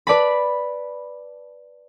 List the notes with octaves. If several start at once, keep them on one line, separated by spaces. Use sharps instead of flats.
B4 D5 A5 B5